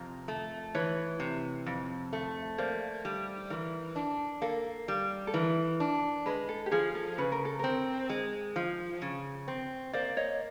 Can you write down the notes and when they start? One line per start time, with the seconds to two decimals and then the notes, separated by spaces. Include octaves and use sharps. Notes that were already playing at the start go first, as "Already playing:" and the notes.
Already playing: F2 C3 A#4
0.28 A3
0.75 E3 B4 C#5
1.20 C3
1.66 F2
2.13 A3
2.58 A#3 C5 D5
3.05 G3
3.50 E3 A#4
3.96 D4
4.42 A#3 A4
4.88 G3
5.27 A4
5.34 E3 A#4
5.80 D4
6.26 G#3 B4
6.49 A4
6.66 G4
6.71 F3 G#4
6.95 A4
7.18 C#3 B4
7.32 A#4
7.45 A4
7.59 C4 A#4
8.10 G#3
8.56 F3
9.02 C#3
9.48 C4
9.93 A#3 C5 D5
10.17 C#5 D#5